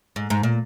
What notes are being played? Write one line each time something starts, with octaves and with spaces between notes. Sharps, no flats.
G#2
G#2
A#2